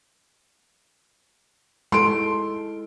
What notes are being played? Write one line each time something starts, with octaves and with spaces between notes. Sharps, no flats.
G#3 E4 A4 C6 D7